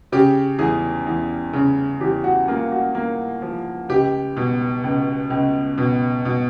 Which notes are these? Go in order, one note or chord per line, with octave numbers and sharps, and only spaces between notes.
C#3 G4
E2 G#4
E2
C#3
E2 G4
F#4
A#3 F4
F#4
A#3
F3
C#2 G4
B2
C#2
C#2
B2
B2